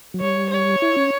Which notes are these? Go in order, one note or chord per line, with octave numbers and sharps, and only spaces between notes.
F#3
G3 C#5
C#5
E4
C#4